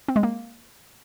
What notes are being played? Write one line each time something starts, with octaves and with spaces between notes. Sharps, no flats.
C4
G#3
A#3